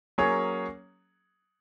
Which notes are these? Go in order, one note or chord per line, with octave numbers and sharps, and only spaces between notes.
F#3 A#3 C#4 G#4 C#5